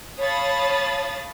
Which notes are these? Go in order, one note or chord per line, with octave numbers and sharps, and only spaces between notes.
C#5 F5 A5 B5 D#6 A6